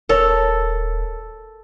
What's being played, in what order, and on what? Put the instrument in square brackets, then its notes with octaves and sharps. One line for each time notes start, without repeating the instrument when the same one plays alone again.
[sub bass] D#1 [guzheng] A4 [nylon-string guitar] A#4 C#5